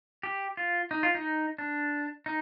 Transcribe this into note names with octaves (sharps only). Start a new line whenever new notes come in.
G4
F4
D#4
F4
D#4
D4
D#4